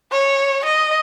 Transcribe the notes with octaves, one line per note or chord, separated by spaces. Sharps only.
C#5
D#5